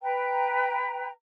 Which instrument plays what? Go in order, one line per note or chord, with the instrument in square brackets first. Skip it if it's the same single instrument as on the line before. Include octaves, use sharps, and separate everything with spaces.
[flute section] B4 G5 A#5